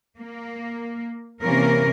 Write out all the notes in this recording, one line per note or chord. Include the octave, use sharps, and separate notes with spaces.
A#3
C3 E3 A#3 C#4 A#4